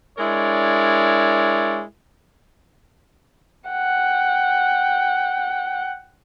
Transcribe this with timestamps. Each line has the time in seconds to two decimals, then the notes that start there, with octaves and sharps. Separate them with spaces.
0.18 G#3 D4 E4 A#4 C#5 D5
3.70 F#5 G5